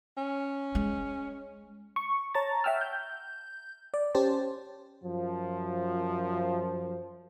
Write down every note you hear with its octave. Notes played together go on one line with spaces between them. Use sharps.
C#4
G#3
C#6
C#5 A5 A#5 A6
E5 F#5 G5 E6 F6
G6
D5
C#4 G4 C5 A5
F#2 F3